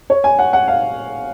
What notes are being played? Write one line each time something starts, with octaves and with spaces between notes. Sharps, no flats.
C#5
G#5
F#5
F#5
F5